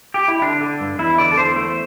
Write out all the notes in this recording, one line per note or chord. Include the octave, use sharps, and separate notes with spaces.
G4
E4
D3 D4
D3
G2
E2 E4
D3 D5
A4
E2 C5
A3